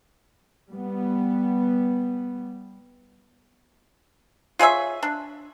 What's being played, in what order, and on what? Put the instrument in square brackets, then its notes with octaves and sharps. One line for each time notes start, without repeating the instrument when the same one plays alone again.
[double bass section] G3 B3
[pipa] F4 G#4 C#5 E5
D4